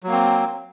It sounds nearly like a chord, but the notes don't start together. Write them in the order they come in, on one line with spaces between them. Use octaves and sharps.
F#3 A#3 C4